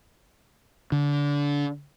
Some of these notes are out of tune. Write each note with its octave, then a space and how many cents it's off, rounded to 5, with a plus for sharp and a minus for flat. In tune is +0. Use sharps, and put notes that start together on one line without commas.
D3 -25